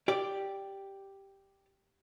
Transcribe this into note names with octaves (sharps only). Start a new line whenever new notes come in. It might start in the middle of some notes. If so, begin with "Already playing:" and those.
G4 D5